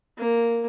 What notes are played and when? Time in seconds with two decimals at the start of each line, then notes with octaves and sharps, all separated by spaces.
0.18 A#3